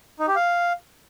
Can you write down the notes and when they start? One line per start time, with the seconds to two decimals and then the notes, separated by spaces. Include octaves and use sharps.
0.19 D#4
0.28 G4
0.36 F5